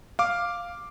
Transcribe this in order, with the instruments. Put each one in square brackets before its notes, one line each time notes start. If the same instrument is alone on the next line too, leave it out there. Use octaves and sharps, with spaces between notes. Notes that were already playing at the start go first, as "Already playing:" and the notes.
[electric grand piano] F5 D6